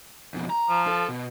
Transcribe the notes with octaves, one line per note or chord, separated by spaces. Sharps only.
F2 B2
A#5
F3
A4
B2